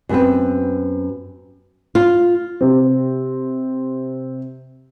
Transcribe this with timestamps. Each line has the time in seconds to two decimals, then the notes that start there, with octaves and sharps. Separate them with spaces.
0.09 F#2 B3 C4 B4
1.95 F4
2.61 C3 C4